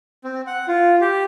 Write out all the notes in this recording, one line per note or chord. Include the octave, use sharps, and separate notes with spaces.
C4
F#5
F4
G4